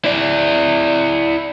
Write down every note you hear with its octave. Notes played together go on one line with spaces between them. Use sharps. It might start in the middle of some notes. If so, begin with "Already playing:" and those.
E4 D5